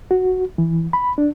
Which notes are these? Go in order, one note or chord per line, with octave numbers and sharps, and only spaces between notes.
F#4
E3
B5
D4